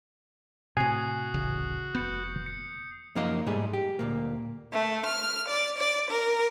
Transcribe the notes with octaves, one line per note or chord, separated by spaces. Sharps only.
A2 C3 F#4 G#5 D#6 C7
D1 A1 C#3
F1 B3 G6 C#7
C#7
F#2 F3 A#3 D#4 A#4 F5
G#2 G3 A3 G#4
G4
D2 A#2 A#3
A3
F6
D5
D5
A#4